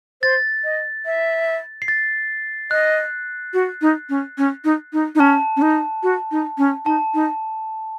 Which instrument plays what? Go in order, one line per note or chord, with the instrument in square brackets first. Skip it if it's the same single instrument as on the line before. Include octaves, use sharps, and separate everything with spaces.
[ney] C5 [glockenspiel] A6
[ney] D#5
E5
[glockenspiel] C7
A6
[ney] D#5 [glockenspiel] F#6
[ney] F#4
D#4
C#4
C#4
D#4
D#4
D#4
[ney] C#4 [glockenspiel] A5
[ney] C#4
D#4
F#4
D#4
C#4
[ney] D#4 [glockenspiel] A5
[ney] D#4